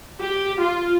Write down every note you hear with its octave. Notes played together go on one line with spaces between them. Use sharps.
G4
F4